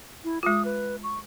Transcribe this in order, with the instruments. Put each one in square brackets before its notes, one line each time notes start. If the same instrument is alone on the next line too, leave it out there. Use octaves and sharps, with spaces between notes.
[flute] E4
[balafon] G#3 F4 [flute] D#6
[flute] B4
C#6